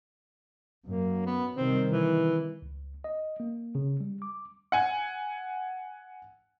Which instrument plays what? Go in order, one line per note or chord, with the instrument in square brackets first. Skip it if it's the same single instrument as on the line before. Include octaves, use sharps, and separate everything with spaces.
[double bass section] F#2 [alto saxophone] A#3
[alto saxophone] B3
[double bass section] C3 D#3 G3 [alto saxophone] C4
[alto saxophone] E3
[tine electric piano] C#2
D#5
A#3
C#3
G3
D6
[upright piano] F#5 G#5